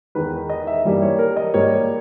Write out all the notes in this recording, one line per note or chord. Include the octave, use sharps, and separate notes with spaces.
E2 D#3 G#3 B4
D#5
E5
G2 E3 G3 A#3
C#5
A#4
D#5
G#2 G3 A#3 C#5